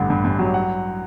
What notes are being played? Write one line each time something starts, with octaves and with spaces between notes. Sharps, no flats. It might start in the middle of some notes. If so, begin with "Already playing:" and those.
Already playing: A1 G2 D3
G2
G2
F#3
F#5